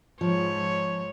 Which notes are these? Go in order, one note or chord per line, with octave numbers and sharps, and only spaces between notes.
G#2 F3 C#5